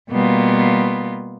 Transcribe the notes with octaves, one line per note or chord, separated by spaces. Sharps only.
B2 G3 A#3 B3 F4